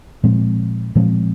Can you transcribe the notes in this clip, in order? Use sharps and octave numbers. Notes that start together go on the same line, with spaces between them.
A#2 F3 G#3 C4
A#2 F3 G#3 C4